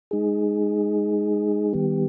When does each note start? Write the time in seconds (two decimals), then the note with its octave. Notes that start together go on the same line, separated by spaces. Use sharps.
0.11 G#3 D#4 G#4
1.73 D#3 G3 B3 G4